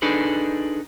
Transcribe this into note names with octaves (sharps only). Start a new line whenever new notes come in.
D4 D#4 G#4 A4 B4